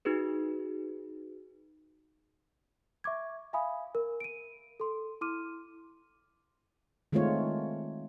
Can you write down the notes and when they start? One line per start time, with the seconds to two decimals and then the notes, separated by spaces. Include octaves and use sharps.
0.05 D#4 F#4 G#4 B4
3.04 E5 C#6 D6 G#6
3.53 E5 F5 G#5 B5 D#6
3.95 A#4
4.20 D7 D#7
4.80 A4 C6
5.21 E4 C6 D6 F6 D#7
7.12 D#3 G#3 A3 C4 F4 C#5